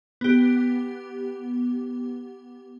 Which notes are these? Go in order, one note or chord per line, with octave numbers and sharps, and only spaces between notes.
B3 G4